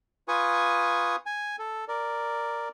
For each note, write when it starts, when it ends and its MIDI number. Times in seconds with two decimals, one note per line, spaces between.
0.28 1.16 65
0.28 1.16 71
0.28 1.16 80
0.28 1.16 85
0.28 1.16 87
1.26 1.56 80
1.59 1.85 69
1.88 2.68 70
1.88 2.68 74